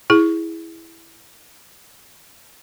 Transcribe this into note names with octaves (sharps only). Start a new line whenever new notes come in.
E4 G#4